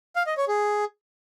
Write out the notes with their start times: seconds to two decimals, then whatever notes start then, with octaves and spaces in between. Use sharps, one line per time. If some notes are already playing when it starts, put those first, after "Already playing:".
0.16 F5
0.26 D#5
0.37 C#5
0.48 G#4